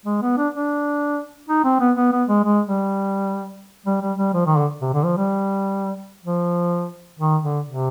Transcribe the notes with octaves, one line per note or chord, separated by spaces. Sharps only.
G#3
B3
D4
D4
D#4
C4
B3
B3
B3
G#3
G#3
G3
G3
G3
G3
F3
D#3
D3
C3
D3
F3
G3
F3
D#3
D3
C3